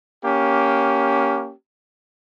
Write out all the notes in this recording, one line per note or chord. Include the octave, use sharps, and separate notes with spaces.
A#3 C#4 G4